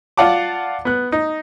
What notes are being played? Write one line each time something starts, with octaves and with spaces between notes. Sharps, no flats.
F4 D5 F5 F#5 A5 D6
B3 F#6
D#4